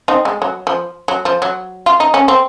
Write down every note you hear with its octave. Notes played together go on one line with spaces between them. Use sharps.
C4 D#4
G#3
F#3
F3
F#3
F3
F#3
F4
D#4
C#4
C4